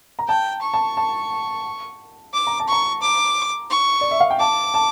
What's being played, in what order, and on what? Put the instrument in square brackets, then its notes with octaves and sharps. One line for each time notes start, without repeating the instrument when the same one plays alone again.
[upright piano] A#5
[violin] G5 [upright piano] A5
[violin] C#6
[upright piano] A5
A5
[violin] D6
[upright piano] A#5
A5
[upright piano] A#5 [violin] C#6
[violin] D6
C#6
[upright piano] D5
E5
F5
G5
[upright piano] A5 [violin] D6
[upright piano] A5